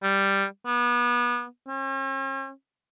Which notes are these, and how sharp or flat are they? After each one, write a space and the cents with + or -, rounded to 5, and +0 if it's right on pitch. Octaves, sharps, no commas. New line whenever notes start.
G3 +5
B3 -30
C#4 -45